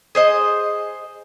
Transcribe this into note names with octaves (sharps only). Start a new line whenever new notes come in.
G#4 C5 D#5